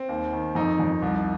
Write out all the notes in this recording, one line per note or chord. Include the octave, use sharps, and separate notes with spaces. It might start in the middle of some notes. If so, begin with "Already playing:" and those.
Already playing: C4
D#2
D#3
F2 D#4
F2
C2